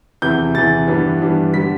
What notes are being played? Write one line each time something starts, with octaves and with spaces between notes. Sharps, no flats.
E2 C3 E3 G6
E2 C3 E3 A6
G2 E3 G3 B3 D4
G2 E3 G3 B3 D4
D3 G3 B3 D4 B6